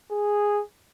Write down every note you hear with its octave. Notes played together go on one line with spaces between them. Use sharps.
G#4